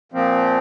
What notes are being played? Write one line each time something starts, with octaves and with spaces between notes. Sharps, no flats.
A#2 F3 C4